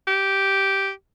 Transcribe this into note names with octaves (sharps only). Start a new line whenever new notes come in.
G4